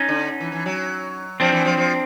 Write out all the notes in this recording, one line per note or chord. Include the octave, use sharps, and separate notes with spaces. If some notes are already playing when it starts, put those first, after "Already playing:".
Already playing: C#4 D#4
D3
E3
E3
F#3
F3 C4 D4
E3
F3
F3